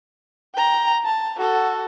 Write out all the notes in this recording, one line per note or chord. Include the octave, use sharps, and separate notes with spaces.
G5 A#5
A5
F#4 A4